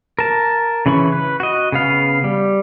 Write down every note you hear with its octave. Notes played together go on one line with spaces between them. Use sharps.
A#4 A5
C#3 E3 C#4 B5 C#6
B4
F#4 D#5
C#3 B3 F5
G3